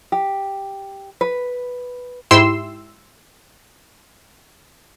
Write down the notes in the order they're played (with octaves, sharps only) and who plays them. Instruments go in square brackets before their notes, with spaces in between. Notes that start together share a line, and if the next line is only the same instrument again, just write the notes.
[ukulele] G4
B4
[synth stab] G#2 E4 G4 C6 E6